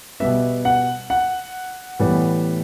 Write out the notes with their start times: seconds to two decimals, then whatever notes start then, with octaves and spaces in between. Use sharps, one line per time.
0.20 B2 G3 B3 E5
0.65 F#5
1.10 F#5
1.99 A2 E3 G3 B3